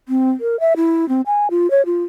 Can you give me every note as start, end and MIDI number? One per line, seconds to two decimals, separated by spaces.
0.09 0.30 60
0.40 0.59 70
0.60 0.73 76
0.77 1.08 64
1.09 1.21 60
1.26 1.48 80
1.51 1.70 65
1.71 1.85 73
1.86 2.04 65